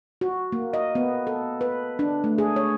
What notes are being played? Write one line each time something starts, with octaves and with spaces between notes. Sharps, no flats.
F#4
A#3
D#5
B3
A4
B4
D4
A3
G#4
C#5